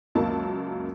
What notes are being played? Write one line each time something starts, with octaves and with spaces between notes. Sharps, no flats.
C#2 F#2 F#3 A#3 A5